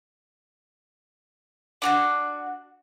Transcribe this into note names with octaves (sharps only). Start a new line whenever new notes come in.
D4 F4 F#4